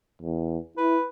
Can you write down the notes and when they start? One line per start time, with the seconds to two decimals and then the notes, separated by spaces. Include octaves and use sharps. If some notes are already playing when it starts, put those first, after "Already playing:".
0.22 E2
0.77 E4 B4